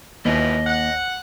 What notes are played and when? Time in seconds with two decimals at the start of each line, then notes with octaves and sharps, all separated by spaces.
0.25 D#2 B2 E3 F3 D#5
0.66 F#5